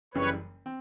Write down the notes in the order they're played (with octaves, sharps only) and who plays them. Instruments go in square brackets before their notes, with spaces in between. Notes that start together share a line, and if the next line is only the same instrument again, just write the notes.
[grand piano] F#1 F#2 C#3 E3 G3 [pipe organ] B4 C#5
[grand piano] C4